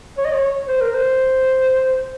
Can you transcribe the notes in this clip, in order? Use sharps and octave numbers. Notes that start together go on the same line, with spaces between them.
C#5
D#5
C#5
C5
A#4
C5